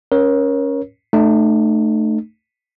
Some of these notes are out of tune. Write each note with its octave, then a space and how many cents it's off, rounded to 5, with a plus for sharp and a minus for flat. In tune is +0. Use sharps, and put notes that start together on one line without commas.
C#4 +0 A#4 +25 C#5 -15
A3 +0 D#4 -40